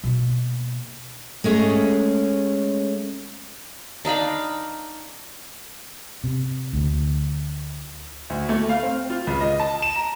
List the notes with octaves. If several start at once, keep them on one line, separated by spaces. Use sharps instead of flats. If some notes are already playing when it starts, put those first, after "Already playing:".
B2 A#3
G#3 A3 C#4
D4 D#4 F5 B5
C3
D2
D2
A3
F5
C4
F4
C#2
D#5
A5
E7
A#5